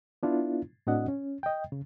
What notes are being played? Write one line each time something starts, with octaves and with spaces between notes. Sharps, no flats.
B3 D4 E4 F4
A2 C4 D4 F#4 D#5 F#5
C#4
D#5 G5
C#3